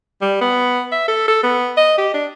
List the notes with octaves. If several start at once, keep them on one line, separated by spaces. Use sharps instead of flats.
G3
B3
E5
A4
A4
B3
D#5
G4
D4